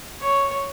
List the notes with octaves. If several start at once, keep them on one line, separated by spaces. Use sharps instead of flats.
C#5